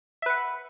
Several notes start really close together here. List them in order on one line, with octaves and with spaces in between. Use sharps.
E5 B4 F#5